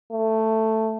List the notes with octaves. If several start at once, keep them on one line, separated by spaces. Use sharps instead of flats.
A3